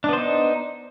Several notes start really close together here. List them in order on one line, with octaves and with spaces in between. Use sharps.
D4 B3 C5 D#4